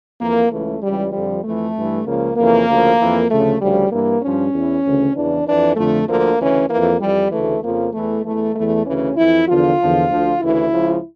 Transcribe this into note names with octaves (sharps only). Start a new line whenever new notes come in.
F2 E3 A#3
C#2 C#3 E3 A3
C#2 C#3 E3 G3
F2 D3 F3 G3
F2 E3 A3
G2 E3
C#2 C#3 F3 A#3
F2 C#3 E3 A#3
D2 C#3 F3
F2 E3
D2 C#3 F3 A3
D2 C#3 F3 G3
G2 E3 A#3
G2 F3 C#4
E2 E3
D2 C#3 E3
E2 C#3 E3 D4
F2 E3 D4
F2 D3 F3 A3
D2 D3 F3 A#3
D2 C#3 E3 C#4
F2 E3 A#3
F2 E3 G3
D2 C#3 E3 A3
F2 C#3 F3 A#3
E2 E3 A3
E2 E3 A3
E2 E3 A3
D2 C#3 E3 C#4
F2 E3 E4
E2 D3 F3 F4
E2 D3 F3
D2 D3 F3
D2 C#3 E3 E4
C#2 C#3 F3